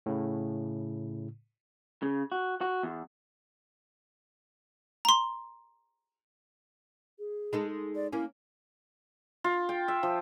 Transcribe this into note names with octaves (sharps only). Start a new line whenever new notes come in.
A2 C#3
C#3
F#4
F#4
E2
A#5 C6
G#4
G#3 D#4 A4
D5
A#3 C#4 E4
F4
G5
E5
F3